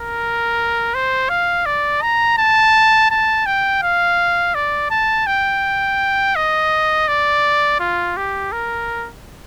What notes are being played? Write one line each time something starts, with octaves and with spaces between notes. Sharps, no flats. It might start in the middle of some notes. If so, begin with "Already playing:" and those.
Already playing: A#4
C5
F5
D5
A#5
A5
A5
G5
F5
D5
A5
G5
D#5
D5
F4
G4
A#4